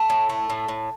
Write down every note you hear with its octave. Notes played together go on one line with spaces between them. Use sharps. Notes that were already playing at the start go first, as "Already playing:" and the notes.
Already playing: A3
A2
A3
A2
A2